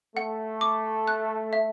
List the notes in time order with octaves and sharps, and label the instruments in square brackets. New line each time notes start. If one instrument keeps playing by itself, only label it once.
[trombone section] A3 [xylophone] F#5
[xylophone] D6
F#6
E5